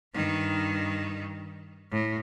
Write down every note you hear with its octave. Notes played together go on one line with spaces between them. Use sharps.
G2 D#3
A2